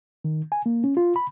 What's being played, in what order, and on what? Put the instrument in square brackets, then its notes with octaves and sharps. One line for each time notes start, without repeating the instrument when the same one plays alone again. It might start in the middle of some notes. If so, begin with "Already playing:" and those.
[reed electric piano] D#3
G#5
A#3
C#4
F4
B5